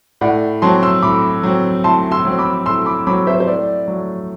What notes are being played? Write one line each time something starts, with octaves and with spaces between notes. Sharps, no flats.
A2 D5 F#5
F#3 C4 A5 C6
C6 E6
A2 B5 D6
F#3 C4
A2 A5 C6
C6 E6
F#3 C4
B5 D6
A2 C6 E6
B5 D6
F#3 C4 B5 D6
C5 E5
C5
A2 D5
F#3 A3